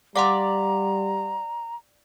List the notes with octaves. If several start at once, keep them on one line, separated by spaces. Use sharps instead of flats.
G3 D5 F5 F#5 A#5 C6